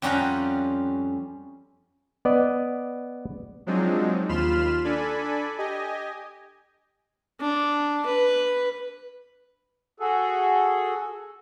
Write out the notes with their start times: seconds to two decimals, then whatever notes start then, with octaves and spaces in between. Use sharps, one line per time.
0.02 F2 G3 C#4 F4 F#5 A#5
2.25 B3 D5 D#5
3.66 F3 F#3 G#3 C4 D4 D#4
4.29 D#2 F4 B5 C6 F6 E7
4.84 D4 A4 D5 G#5 B5
5.58 G4 D#5 G#5
7.41 D4
8.06 B4
10.00 F#4 G#4 A4